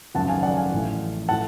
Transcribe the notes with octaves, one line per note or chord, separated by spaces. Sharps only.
G#1 F#2 C#3 F3 F#5 A5
F5 G#5
D5 F#5
F5 G#5
A1 A2 F3
A2 F3 F#5 A5